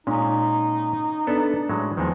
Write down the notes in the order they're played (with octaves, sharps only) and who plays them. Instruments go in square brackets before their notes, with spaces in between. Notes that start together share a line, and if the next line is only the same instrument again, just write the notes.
[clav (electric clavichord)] A#2 G#3 [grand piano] C#4 [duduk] D#4
[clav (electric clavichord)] B3 A4 E5 [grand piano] D4
[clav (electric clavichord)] A2 F#3 G#3
[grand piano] E2 [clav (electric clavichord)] D#3 G#3 [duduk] F3